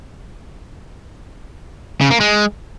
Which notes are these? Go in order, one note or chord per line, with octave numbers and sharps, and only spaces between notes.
C#3
A#3
G#3